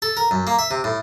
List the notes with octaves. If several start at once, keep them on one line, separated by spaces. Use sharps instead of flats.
A4
A#4
F#2
A#3
E5
C3
A2